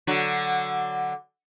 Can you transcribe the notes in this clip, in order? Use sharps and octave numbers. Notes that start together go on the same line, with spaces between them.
D3 F#3 F#4